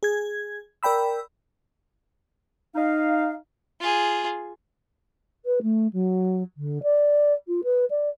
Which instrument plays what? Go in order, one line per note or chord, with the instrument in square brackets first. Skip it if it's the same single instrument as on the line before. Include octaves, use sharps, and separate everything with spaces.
[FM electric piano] G#4 G#6
A#4 D5 G5 B5 E6
[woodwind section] D#4 F5
[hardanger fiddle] F4 G#4
[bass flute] B4
A3
F#3
D3
D5
F4
B4
D5